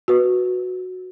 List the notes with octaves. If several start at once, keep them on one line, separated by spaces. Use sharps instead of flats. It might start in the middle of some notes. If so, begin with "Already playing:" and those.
F#4 B4